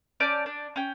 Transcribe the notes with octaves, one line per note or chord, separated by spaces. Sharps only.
C#4 D5 A5 G6
D4
C#4 G5